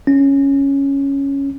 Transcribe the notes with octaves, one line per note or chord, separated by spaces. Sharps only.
C#4